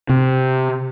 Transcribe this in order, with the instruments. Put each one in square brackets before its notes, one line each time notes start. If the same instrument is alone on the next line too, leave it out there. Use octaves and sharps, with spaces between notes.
[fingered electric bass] C3